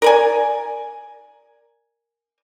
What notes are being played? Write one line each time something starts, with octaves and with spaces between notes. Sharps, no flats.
A#4 D5 G#5